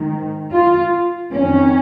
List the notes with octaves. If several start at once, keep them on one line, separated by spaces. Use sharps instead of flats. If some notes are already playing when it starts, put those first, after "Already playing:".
Already playing: G#2 D#3
F4
F2 D#3 C#4